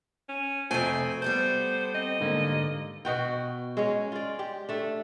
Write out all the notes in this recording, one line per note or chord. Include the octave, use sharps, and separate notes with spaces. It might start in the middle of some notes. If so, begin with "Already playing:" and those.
C#4
F2 C3 A3 C4 F#4 G#5
G3 B3 A4 C5
C4 D#5
G#2 D3 A#3
B2 F#4 G5
G#3 C#4
F4 D5
G4
A3 D4